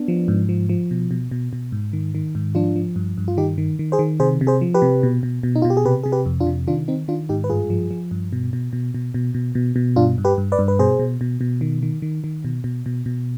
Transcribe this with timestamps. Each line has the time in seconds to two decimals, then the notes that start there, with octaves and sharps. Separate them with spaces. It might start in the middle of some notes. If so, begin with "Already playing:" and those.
Already playing: B3 D4
0.08 F3
0.28 G#2
0.49 F3
0.69 F3
0.91 B2
1.11 B2
1.31 B2
1.53 B2
1.72 G#2
1.93 D#3
2.15 D#3
2.35 G#2
2.55 F3 D4 F4
2.76 F3
2.96 G2
3.18 G2
3.28 F4
3.37 D#3 D#4 G4
3.58 D#3
3.79 D#3
3.92 G#4 C5
3.99 D#3
4.20 C3 G#4 C5
4.41 C3
4.47 G#4 C5
4.61 F3
4.74 G4 B4
4.82 C3
5.03 B2
5.23 B2
5.43 B2
5.55 D#4
5.62 F4
5.65 B2
5.70 G4
5.77 G#4
5.85 C3 G4 B4
6.03 C3 G#4
6.12 G4 B4
6.26 F2
6.40 D4 F4
6.47 C3
6.68 D#3 D4 F4
6.88 D#3 C4 D#4
7.08 D#3 D4 F4
7.29 G#2 D#4 G4
7.44 B4
7.50 G2 F4 G#4
7.70 F3
7.91 F3
8.11 G2
8.33 B2
8.53 B2
8.73 B2
8.95 B2
9.14 B2
9.35 B2
9.55 B2
9.76 B2
9.96 G2 D4 F4
10.18 G2
10.25 G4 B4
10.38 G2
10.52 B4 D5
10.59 G2
10.68 B4
10.79 B2 G#4 C5
10.99 B2
11.21 B2
11.41 B2
11.61 D#3
11.83 D#3
12.02 D#3
12.24 D#3
12.45 B2
12.64 B2
12.86 B2
13.06 B2